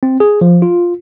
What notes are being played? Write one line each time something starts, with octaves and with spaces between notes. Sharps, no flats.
C4
G#4
F3
F4